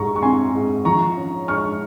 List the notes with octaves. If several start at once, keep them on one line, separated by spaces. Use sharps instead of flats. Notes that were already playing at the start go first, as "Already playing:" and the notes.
Already playing: G#2 G3 A#5 C#6
C#6
C4 G#5 C6
G#2
F3 A#5 C#6
C#4
G#3 C#6 F6